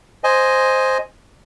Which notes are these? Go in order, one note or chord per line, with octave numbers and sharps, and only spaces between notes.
C5 D#5 G#5